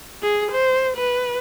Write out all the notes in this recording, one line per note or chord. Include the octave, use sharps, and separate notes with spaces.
G#4
C5
B4